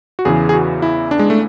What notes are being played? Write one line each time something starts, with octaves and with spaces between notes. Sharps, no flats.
F#4
E2 C#3 E3 G#4
G#4
F#4
E4
D4
G#3
A3